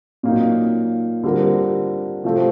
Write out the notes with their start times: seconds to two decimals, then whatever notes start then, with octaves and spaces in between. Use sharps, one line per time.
0.23 A#2 F#3 A#3 D#4
1.24 D3 G3 C4 F4 A#4
2.24 C3 F3 A3 C4